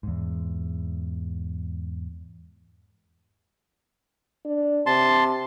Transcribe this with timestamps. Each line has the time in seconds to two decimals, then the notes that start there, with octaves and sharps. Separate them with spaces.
0.03 E2 G#2
4.45 D4
4.86 C3 A5 C6